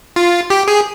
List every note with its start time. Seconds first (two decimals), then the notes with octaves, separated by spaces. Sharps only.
0.16 F4
0.50 G4
0.68 G#4